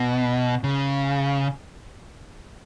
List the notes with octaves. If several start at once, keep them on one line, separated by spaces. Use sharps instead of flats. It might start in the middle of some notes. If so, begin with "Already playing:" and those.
Already playing: B2
C#3